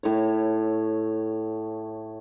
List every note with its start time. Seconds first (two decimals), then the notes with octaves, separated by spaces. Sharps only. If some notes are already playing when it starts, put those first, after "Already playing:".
0.03 A2 C#5